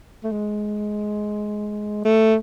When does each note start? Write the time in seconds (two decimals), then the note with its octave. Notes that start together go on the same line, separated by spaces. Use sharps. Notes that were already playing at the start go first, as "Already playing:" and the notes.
0.24 A3
0.32 G#3
2.05 A3